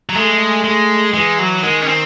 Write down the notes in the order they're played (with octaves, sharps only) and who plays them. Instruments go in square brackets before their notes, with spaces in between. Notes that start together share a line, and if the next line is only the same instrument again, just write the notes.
[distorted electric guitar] F#3
[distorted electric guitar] G#3 [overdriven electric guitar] A3
[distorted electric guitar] G#3
[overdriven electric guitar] E3 [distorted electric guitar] G#3
[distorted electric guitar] F#3
[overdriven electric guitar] D#3 [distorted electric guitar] G#3
[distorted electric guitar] C#4
C4